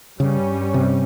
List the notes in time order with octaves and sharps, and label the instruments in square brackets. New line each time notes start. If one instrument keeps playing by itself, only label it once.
[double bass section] G2 G3 C#4 [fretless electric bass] C#3
[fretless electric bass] C3